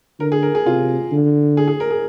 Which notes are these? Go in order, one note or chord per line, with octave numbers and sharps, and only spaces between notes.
D3 A#4
G#4
A#4
G#4
C3 F4
D3
G#4
G#4
A#4
G#4